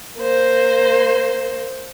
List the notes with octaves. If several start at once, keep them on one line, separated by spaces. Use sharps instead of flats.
A#3 C5